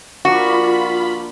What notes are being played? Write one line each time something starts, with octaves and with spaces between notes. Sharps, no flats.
F3 A#3 D4 F4 F#4 B5